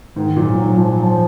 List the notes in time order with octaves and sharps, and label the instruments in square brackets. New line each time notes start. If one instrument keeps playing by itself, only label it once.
[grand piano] G#2 [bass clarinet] D#3
[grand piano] A#2 [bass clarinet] F#3
[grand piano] G#2 [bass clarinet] F#3
[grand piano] A#2 [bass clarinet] F3
[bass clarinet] F#3
F3